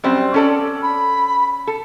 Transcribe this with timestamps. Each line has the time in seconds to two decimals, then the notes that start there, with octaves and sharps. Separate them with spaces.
0.04 F#2 G3 C4
0.34 C#4 A4 D5
0.82 B5
1.67 A4